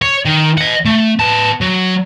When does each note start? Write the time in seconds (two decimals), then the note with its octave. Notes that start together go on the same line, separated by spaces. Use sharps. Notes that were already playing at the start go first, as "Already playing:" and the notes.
0.02 C#5
0.26 D#3
0.58 D#5 F#5
0.85 A3
1.19 B3 A5
1.61 F#3